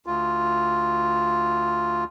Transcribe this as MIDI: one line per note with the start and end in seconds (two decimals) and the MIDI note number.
0.06 2.04 38
0.06 2.04 65